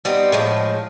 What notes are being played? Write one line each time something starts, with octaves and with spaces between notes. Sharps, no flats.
G3 B3 C4 D#4
A2 F3 G#3